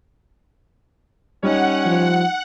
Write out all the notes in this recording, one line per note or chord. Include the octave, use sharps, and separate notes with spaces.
G3 C#4 D#4 F#5
F3